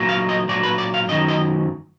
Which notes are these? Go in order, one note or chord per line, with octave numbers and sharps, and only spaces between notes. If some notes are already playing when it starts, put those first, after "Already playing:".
Already playing: A#2 F#3
F5
D#5
A#2 F#3 D5
B4
D5
F5
F#2 D#3 F#3 D#5
D#5